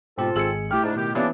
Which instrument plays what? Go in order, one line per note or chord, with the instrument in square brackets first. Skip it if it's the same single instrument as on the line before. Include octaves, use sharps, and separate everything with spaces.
[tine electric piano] G#2 B2 G4 [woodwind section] C4 F4 A4
[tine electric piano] G#1 G#3 C#7 [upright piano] G#4 E6 F#7
[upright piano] A2 F6 [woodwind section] G4
[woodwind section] G#2 C#3 D4 [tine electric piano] D#4
[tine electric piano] B2 [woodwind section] D#3 G4
[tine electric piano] E3 [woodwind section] G3 A#3 D4 [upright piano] B3 C#4 E4